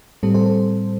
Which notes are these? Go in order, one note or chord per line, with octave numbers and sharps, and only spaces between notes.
A2 G3 C4 A4
A4 C5
A4